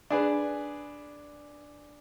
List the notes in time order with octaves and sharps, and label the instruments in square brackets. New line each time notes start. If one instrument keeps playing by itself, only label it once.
[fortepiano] D4 G#4 B4